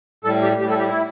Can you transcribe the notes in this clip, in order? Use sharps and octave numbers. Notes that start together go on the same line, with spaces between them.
A2 G3 A4
G4
A2 G3 G4
A4
G4
E4